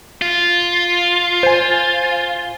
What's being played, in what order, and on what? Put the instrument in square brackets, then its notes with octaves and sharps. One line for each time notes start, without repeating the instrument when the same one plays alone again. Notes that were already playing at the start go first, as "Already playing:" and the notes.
[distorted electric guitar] F4
[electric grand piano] C5 G#5